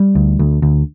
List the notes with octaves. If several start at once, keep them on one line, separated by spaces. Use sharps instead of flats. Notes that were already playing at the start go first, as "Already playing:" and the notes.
Already playing: G3
D2
D2
D2